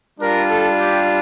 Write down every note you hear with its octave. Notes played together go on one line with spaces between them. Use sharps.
G3 D4 F4 A#4
A4
G4